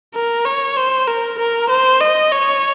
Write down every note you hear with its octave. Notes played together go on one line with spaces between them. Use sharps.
A#4
C#5
C5
A#4
A#4
C5
D#5
C#5